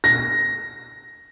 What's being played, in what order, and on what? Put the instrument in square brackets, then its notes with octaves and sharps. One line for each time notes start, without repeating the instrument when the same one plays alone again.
[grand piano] A#6